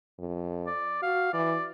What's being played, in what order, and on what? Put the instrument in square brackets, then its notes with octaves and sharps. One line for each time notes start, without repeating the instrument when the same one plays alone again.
[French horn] F2
[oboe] D5
[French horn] F#4 [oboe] F5
[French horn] E3 [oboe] D5